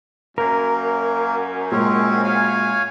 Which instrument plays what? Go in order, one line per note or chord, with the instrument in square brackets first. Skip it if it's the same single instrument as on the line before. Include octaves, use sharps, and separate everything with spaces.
[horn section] F#2 [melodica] A#3 [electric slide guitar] A#4
[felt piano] A#2 G#3 [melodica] C4 C#4
[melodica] C#5 F5 G#5